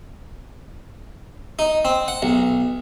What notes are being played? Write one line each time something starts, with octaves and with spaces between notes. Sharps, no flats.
D#4
C4
F#5
B1